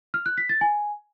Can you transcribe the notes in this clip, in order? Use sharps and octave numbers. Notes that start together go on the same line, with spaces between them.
F6
F#6
B6
A6
G#5